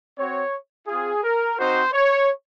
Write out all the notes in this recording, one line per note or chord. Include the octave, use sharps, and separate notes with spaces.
C4 F#4 C#5
C4 F4 G#4
A#4
C4 D#4 F#4 C5
C#5